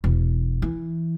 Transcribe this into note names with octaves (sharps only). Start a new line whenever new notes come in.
E1
E3